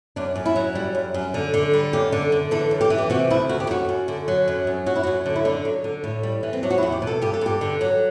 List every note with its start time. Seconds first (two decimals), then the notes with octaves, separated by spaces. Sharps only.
0.16 F#2 D4
0.36 F#2
0.46 E4
0.56 F#3
0.75 G3
0.95 F#2
1.14 F#2
1.34 D3
1.54 D3
1.73 G3
1.93 F#2 G4
2.12 D3
2.32 D3
2.51 E3 A4
2.71 F#2
2.81 G4
2.90 E3
2.98 G4
3.10 C3 F#4
3.30 D2 E4
3.49 D2 F#4
3.60 G4
3.70 F#2 F#4
3.89 F#2
4.08 D3
4.28 F#3
4.48 F#2
4.67 F#2
4.86 F#3 F#4
4.96 E4
5.03 F#2 F#4
5.26 D3
5.36 E4
5.45 D3 D4
5.65 F#3
5.84 D3
6.04 A2
6.23 G3
6.43 E3
6.53 C4
6.63 F#3 D4
6.70 F#4
6.78 E4
6.83 E2
6.92 G4
7.02 B2
7.07 A4
7.21 G2 G4
7.34 A4
7.41 G2 G4
7.61 D3
7.81 F#3